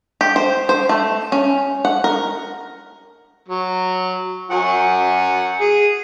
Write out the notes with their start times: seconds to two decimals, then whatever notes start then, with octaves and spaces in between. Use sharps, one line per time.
0.21 G4
0.36 C5
0.69 C5
0.89 A3
1.32 C#4
1.85 F#5
2.04 A#4
3.48 F#3
4.51 F#3 F#5 G#5
5.61 G#4